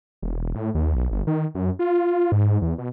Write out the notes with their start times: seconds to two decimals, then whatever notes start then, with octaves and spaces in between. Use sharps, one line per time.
0.23 E1
0.55 A2
0.75 D#2
0.95 B1
1.11 G1
1.27 D#3
1.55 F#2
1.79 F4
2.32 G#2
2.62 E2
2.78 B2